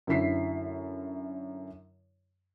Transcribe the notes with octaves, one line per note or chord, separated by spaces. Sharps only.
F#2 D3 E4 B6 C7